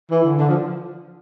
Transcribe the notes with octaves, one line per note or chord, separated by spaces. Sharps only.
E3
D3
D3
F3